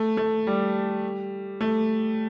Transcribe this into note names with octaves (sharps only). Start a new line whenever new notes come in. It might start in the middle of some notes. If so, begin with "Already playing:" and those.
Already playing: A3
A3
G3
A3